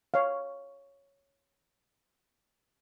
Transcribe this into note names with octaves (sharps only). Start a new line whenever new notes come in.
C#5 F5